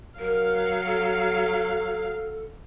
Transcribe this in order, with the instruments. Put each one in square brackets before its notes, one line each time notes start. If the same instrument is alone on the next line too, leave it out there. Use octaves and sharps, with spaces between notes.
[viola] F#3 F5 [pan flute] A#4
[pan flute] A4